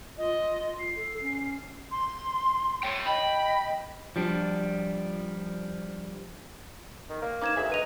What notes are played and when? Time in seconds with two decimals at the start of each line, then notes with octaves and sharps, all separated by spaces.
0.18 F4 D#5
0.79 C7
0.96 A4
1.21 C#4
1.91 C6
2.83 C#5 G5
3.06 D#5 G5 B5
4.16 F3 G3 D4
7.09 D#3
7.22 A#3
7.42 D#4 B4 C5 D6 G#6 E7
7.56 D2 G#4 E5
7.70 B4 D#5 A#5 D#7 F7